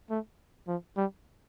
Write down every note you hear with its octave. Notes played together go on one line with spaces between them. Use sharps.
A3
F3
G3